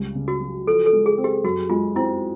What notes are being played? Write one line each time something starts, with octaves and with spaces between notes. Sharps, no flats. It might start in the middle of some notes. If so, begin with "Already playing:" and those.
Already playing: C#2 G3
C#3
F#4
F#3
F3 A4
A4
G#3
G#4
C4
G4
F#2 F#4
G#3 F4
C4 E4